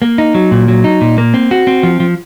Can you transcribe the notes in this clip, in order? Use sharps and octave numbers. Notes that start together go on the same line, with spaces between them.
A#3
D#4
F#3
A#2
F#3
D#4
A#2
A#3
C4
F#4
C4
F3
F3